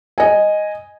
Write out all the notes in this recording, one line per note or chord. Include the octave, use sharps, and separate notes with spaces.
D#5 G#5